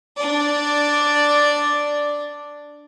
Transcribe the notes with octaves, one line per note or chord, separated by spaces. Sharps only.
D4 D5